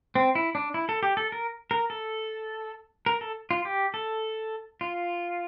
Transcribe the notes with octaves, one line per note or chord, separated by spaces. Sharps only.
C4
E4
D4
E4
A4
G4
A4
A#4
A#4
A4
A#4
A4
F4
G4
A4
F4